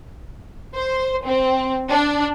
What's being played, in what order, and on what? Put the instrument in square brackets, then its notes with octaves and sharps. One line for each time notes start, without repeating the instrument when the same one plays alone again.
[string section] C5
C4
D4